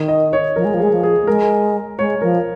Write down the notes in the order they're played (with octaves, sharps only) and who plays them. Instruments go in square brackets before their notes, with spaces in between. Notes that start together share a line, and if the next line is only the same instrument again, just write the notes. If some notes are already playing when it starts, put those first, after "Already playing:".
Already playing: [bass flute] D#3
[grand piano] D#5
C#5
[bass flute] F3 [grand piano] A#4
[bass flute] G#3
F3
[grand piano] G#4
[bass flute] G#3
F3
[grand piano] G#4
[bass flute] A#3
[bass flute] G#3 [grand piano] A#4
[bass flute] G#3 [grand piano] C#5
[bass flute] F3 [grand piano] A#4